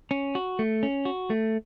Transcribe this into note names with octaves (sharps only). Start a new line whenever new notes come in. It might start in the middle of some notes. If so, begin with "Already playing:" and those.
C#4
F#4
A3
C#4
F#4
A3